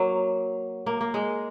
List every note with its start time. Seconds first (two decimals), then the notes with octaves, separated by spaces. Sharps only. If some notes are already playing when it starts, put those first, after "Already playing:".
Already playing: F#3 A#3
0.86 A#3
1.01 A#3
1.14 G#3